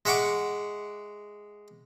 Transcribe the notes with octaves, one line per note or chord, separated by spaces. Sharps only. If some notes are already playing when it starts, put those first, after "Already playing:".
G#3 E5 F#5 C#6 D6